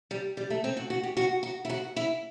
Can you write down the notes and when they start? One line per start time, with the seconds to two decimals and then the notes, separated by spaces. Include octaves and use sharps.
0.11 G3
0.37 G3
0.50 A3
0.64 C4
0.77 F#4
0.90 F#4
1.03 G4
1.17 F#4
1.43 F#4
1.65 E4
1.70 F#4
1.96 E4